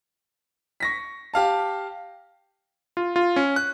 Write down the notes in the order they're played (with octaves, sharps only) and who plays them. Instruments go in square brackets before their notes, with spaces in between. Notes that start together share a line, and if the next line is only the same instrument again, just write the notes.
[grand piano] C#6 A#6 B6
G4 F5 A5
[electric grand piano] F4
F4
C#4
F#6